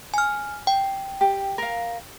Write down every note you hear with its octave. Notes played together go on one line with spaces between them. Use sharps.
G#5 F6
G5
G4
A#4 F5